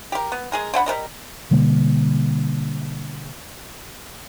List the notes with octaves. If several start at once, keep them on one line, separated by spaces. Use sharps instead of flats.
G4 A#4
B3
G#3 G#4 A#4
D3 A3 F#5 B5
G3 D4 A#4 D#5
B2 D3 G3 A#3